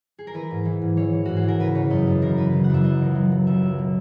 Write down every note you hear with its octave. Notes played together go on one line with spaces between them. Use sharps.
G#4
A#4
E3 B4
G#2
E3
G#2
E3 C#5
E3
G#2 F#4
G#4
E3 A#4
C#3 B4
C#3 C#5
F#2 D#5
F#2
C#3 A#4
E3 B4
C#3
F#5
F#2 E5
F#3 D#5
C#2
F#3
F#3
C#2 E5
F#3
B2